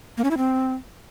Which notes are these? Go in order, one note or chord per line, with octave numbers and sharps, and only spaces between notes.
A#3
C#4
E4
C4